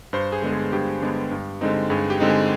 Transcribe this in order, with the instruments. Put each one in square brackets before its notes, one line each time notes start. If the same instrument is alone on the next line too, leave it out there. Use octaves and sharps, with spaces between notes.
[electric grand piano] G2 C5
G#4
D3 G#3 B3 D4
G#4
G2 G4
D3 G#3 B3 D4
G2
D3 G#3 C4 D#4
G2 G#4
G4
D3 G#3 C4 D#4
G#4